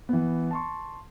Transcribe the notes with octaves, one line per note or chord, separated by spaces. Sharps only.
E3 B3
A5 C6 C#6